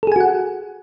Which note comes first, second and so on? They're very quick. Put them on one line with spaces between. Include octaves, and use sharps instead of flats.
A4 G#4 G#5 F#4 F#5